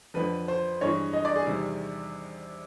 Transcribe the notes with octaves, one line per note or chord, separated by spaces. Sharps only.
F2 D3 F3 B4
C5
G2 E3 G#3 C#5
D#5
D5
G#4
E2 C3 D#3 G3